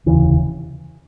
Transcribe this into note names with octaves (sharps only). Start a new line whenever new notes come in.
F1 D#2 C#3 E3